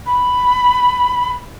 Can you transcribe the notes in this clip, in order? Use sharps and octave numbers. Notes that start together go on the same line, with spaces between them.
B5